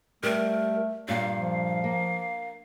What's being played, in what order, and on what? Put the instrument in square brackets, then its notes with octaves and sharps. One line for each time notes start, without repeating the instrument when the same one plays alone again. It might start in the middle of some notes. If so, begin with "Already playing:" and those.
[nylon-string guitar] G3 [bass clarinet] A3 [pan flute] A#4
[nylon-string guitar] G2 A#2 [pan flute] F5
[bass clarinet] F3
[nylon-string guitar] A#3